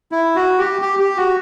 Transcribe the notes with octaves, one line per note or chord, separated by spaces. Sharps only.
E4
F#4
G4
G4
G4
F#4